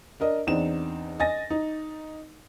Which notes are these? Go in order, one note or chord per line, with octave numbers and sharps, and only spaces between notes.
D4 A#4 D#5
E2 C4 D4 D#4 E7
D#5 G#5 A6 A#6
D#4